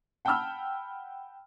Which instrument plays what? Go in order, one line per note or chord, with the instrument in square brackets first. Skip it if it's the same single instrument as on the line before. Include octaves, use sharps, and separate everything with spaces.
[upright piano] F#5 G5 A5 B5 E6 F6